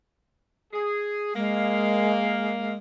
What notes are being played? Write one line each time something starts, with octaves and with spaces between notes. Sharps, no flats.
G#4
G#3 A#3 F5